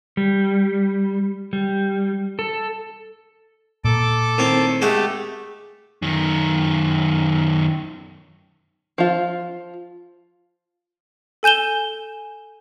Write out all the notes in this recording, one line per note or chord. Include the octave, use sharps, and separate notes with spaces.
G3
G3
A4
A#2 A#3 A4 D6
A2 D#3 C4
G#3 A3 G4 A4 F#5
F#2 D#3
F3 F4
A4 G#5 G6 E7 G7